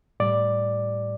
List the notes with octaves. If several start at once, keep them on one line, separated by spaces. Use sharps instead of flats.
A2 G3 D5